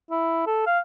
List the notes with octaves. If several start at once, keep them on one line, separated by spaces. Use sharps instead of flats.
E4
A4
F5